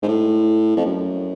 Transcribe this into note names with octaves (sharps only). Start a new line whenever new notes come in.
G#2
A2
F2
F#2